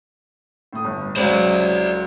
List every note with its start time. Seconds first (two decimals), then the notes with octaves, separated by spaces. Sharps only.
0.73 A2 D#6
0.84 G1
1.16 C#2 F#3 C5 D5